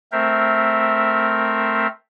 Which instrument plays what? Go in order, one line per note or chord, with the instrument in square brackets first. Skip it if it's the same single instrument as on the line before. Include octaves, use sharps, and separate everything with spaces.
[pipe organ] A3 C4 A#4 C5 E5